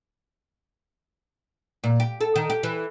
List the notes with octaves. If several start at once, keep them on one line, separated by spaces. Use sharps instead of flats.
A#2
G4
A4
D#3
G4
E3